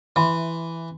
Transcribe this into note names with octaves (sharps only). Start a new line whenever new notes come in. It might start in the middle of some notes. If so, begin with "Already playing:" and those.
E3 E5 B5 C6